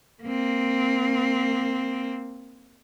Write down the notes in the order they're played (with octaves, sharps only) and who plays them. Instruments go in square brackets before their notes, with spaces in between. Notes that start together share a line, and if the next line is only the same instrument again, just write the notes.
[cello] A#3 C4